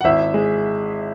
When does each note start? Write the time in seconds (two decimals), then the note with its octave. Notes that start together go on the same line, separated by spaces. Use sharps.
0.01 F#5
0.04 G#1 E4 E5
0.34 G#3